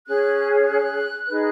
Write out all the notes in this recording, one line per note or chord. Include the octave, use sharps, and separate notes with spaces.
C#4 G#4 C#5 F#6
F#6
D#4 G#4 B4